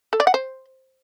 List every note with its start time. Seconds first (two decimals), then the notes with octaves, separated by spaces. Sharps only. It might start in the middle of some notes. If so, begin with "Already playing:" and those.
0.13 A4
0.20 D5
0.27 F#5
0.34 C5